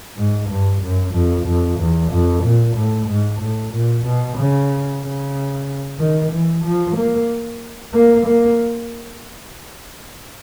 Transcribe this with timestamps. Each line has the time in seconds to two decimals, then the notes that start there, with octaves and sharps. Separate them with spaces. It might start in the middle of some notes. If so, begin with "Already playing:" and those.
0.17 G#2
0.49 G2
0.82 F#2
1.14 F2
1.46 F2
1.79 E2
2.12 F2
2.43 A#2
2.76 A2
3.08 G#2
3.40 A2
3.73 A#2
4.06 B2
4.37 C#3
5.03 C#3
6.00 D#3
6.32 E3
6.65 F3
6.96 A#3
7.94 A#3
8.27 A#3